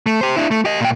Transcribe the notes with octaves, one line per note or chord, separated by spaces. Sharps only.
A3
G4 C5
D4 E4
A3
G4 D#5
A#2 G5